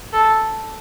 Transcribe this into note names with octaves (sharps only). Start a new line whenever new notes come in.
A4